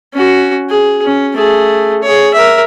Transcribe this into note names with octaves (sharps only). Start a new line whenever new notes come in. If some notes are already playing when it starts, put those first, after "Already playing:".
C#4 F#4
G#4
C#4
A3 G#4
G#4 C#5
A#4 E5